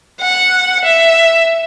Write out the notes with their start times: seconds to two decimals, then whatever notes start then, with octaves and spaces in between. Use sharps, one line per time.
0.21 F#5
0.85 E5